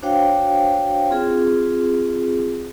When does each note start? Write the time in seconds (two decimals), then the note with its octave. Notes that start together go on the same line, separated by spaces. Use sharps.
0.02 D4 F#4 C5 C#5 F5 G5
1.10 C4 F4 G#4